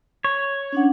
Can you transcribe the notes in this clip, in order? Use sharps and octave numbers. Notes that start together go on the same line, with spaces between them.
C#5
C#4 D4 F#5